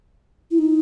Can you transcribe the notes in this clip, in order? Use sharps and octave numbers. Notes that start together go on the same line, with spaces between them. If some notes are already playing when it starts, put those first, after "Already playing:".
E4
D#4